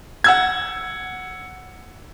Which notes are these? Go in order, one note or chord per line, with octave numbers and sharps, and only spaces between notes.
F#5 E6 G#6